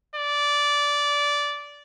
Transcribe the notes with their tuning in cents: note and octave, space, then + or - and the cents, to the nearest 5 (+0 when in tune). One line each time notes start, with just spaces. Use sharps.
D5 -15